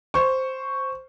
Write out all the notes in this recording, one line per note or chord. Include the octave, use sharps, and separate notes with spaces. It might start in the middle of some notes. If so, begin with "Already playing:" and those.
C5 C#6